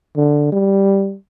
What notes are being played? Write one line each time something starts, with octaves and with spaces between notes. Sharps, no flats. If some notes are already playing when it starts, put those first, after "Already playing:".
D3
G3